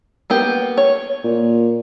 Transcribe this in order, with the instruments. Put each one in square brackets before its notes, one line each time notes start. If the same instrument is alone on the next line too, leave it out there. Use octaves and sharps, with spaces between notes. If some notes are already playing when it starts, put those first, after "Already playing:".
[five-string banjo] A#3 B3 G4
C#5
[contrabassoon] A#2